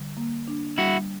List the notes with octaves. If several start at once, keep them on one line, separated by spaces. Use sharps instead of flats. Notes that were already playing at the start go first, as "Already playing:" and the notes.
Already playing: D3 G3
A#3
D4
G3 E4 F#4